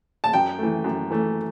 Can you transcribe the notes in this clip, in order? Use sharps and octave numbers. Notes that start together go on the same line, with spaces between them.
A5
F#2 G5
E3 A3
F#2
E3 A3